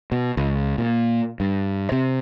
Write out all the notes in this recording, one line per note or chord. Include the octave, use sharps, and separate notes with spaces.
B2
C#2
A#2
G2
C3